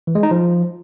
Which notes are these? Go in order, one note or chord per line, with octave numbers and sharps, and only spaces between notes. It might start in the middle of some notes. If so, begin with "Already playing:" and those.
E3
G#3
D#4
F3